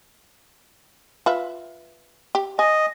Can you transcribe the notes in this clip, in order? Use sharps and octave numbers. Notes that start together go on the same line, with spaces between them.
F4 B4 E5
G4
D#5 G#5